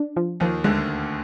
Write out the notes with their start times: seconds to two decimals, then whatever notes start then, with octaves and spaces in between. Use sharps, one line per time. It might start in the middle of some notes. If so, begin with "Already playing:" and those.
Already playing: D4
0.16 F3
0.40 D#2 D#3 F3
0.64 D2 D3 G#3